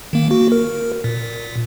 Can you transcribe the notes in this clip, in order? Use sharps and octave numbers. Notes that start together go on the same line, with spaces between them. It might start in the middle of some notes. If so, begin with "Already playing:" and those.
D#3 A#3
A#3 F#4
A#4
A#2